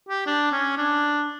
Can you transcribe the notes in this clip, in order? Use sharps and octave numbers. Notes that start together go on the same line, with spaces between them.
G4
D4
C#4
D4